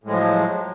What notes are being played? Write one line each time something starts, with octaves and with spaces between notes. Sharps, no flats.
A2 F3 F#3 G#3